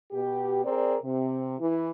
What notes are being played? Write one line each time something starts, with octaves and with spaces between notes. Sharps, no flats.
B2 G4
C4 G#4 A#4 D5
C3
E3 E4